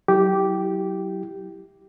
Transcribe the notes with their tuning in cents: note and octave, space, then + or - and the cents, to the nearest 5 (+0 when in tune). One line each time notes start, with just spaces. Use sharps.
F#3 +25 E4 +0 G4 -10